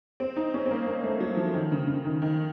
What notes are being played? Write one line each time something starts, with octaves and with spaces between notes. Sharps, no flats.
C4
D#4
C#4
C4
A#3
A#3
A3
F#3
F3
D#3
C#3
C#3
D#3
D#3